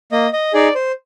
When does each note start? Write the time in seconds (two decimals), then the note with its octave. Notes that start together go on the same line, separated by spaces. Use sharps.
0.12 A#3 D#5
0.33 D#5
0.53 D#4 G#4 D5
0.75 C5